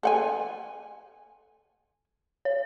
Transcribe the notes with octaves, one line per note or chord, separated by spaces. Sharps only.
A4 F#5 G#5
C#5